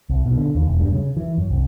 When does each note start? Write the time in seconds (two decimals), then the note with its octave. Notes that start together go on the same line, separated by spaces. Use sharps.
0.09 C2
0.26 B2
0.38 D3
0.55 D#2
0.67 E1
0.80 G2
0.93 C#3
1.17 E3
1.38 F#2
1.50 C2